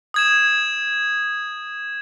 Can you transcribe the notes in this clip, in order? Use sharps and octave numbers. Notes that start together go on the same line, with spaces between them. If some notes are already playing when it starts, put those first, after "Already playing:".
D#6 G#6 E7